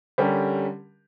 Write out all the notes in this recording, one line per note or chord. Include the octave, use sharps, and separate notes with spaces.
D3 G3 C#4 G4 A#4